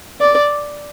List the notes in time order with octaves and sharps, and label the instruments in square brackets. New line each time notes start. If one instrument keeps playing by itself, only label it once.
[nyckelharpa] D5